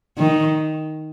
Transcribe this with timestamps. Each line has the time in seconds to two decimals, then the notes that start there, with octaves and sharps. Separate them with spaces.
0.18 D#3